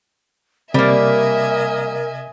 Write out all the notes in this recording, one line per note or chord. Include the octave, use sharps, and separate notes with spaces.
C3 G3 A#3 A#4 D#5 E5 G#5 D6